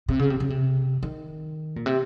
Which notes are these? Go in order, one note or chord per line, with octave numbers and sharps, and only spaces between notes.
C3
C#3
C3
C#3
C3
D#3
A#2
C3